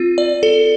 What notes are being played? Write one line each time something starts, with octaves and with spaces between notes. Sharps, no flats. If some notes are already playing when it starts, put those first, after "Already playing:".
Already playing: C4 F4
D5
A4